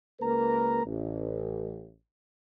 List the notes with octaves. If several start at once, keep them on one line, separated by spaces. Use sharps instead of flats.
C#2 A#3 A#4 B4 A#5
A1